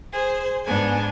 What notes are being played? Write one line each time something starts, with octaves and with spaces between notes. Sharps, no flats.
G#4 C5
G#2 B3 D4 G#5